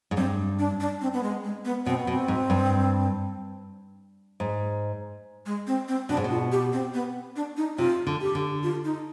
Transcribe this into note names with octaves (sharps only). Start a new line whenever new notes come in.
G#2
G2 C4
D4
D4
C4
B3
G#3
G#3
B3
B2 C4
B3
B2
C4
G#2
G2
G#2
G#3
C4
C4
B2 D4
G#2
B2
F4
G4
C4
B3
D4
D#4
C3 F4
D3
G4
D3
F4
D#4